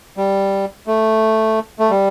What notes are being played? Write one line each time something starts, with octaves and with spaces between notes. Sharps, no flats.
G3
A3
A3
G3